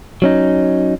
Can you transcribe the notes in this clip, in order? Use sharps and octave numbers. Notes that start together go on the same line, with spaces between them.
F#3 C#4 D#4